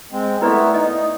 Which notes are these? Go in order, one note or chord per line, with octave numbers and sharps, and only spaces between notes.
G#3 C4
A3 B3 E4 B4 D5
D#4 D#5